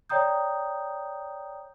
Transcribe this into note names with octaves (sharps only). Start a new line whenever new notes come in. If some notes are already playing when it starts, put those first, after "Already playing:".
C#5 D5 G5 A#5 D#6 G6